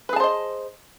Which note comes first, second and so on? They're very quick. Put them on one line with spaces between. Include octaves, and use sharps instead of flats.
B4 G#4 A5 C5 D#5